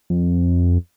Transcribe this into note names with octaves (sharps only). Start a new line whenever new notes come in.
F2